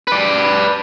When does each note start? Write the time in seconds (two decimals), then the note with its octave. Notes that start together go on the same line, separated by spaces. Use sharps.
0.08 B4 D5